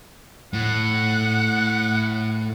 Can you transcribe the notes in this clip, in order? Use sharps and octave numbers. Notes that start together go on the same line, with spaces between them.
A2 F#5